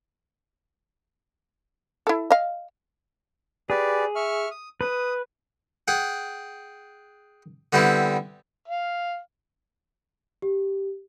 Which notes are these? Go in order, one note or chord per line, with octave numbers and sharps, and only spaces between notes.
E4 A4
D#5 F5
G4 G#4 B4 D5
E5 C#6 F6
D#6
B4 D#6
G#4 F#5 G5
D3 G3 B3 C4 E4
F5
G4